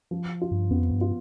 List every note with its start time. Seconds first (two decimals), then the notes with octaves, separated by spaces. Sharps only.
0.11 F3
0.41 F4
0.51 G2
0.71 F2 B3
0.91 G2
1.01 F4